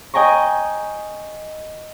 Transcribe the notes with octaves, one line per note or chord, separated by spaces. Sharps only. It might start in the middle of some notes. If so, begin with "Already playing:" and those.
D#5 G5 G#5 A#5 C#6